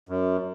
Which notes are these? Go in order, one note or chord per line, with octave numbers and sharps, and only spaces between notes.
F#2